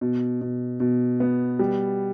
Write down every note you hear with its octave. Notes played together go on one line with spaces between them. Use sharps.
B2
B2
B2
B3
G3